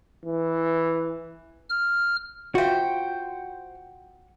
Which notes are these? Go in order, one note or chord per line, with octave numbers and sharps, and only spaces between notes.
E3
F6
F4 F#4 C5 E5 F5 G5